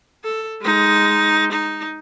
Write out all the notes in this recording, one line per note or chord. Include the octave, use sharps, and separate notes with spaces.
A4
G#3 D#4
D#4